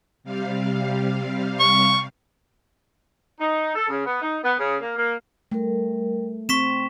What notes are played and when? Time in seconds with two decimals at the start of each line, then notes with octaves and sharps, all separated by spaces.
0.24 C3 G3 F5
1.60 C#6
3.41 D#4
3.75 A4
3.89 C#3
4.04 B3
4.22 D#4
4.43 B3
4.59 C#3
4.80 A#3
4.97 A#3
5.52 G3 A3 A#4
6.49 C4 C6 C#6 B6 E7